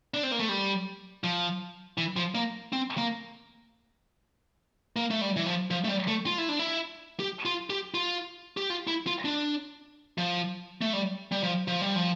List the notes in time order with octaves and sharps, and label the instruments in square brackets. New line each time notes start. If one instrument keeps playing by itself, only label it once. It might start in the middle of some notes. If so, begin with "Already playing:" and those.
[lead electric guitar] D4
C4
A#3
A3
G3
F3
E3
F3
A#3
C4
A#3
A#3
A3
G3
E3
F3
F3
A3
G3
A3
F4
E4
D4
E4
G4
F4
G4
F4
G4
F4
E4
F4
D4
F3
A3
G3
G3
F3
F3
G3
F3